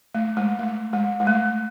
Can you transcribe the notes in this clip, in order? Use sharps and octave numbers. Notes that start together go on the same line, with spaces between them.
A3
G#3
A3
G#3
G#3
A3